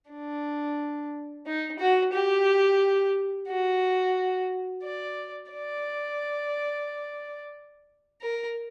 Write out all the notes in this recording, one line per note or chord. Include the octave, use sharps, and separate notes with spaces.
D4
D#4
F#4
G4
F#4
D5
D5
A#4